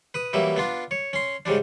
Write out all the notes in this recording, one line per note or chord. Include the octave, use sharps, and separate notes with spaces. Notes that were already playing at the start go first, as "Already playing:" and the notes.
B4 D#6
E3 F#3 G3 A#3 E4
B3 D4 F4
C#5
C#4 C6
G#2 C#3 G3 D4